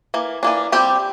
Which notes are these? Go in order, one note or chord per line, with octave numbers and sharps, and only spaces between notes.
E3 A#3
E3 A#3 D4
G3 C4 G4 G5